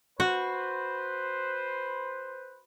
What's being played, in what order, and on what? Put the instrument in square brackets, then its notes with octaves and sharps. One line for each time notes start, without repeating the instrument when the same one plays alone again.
[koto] F#4 [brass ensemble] B4 C5